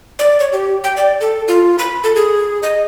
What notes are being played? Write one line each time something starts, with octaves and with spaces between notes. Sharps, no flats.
D5
C#5
G4
G5
D5
A4
F4
B5
A4
G#4
D#5